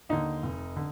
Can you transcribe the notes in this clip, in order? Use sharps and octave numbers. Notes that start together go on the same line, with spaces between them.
D#2 D3 D#4
F1
D3